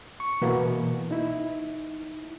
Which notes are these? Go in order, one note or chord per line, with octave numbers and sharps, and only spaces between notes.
C#6
B2 E3 A#3 B3
D#4 E4